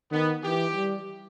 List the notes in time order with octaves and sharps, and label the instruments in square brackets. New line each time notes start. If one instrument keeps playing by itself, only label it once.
[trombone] D#3 [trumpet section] B3
[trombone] E3 [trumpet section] G4
[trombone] G3